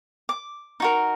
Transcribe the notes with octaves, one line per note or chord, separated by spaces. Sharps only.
D6
D#4 F#4 A#4